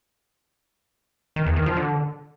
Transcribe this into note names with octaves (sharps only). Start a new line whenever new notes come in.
D#3
E2
D#3
F3
D3